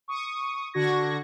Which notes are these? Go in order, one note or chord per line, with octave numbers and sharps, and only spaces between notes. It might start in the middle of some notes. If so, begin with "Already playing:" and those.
C#6 D#6
D3 D4 F#4 C#6 G#6 A#6